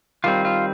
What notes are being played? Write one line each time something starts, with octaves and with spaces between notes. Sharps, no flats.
D#3 G3 C4 F4
F4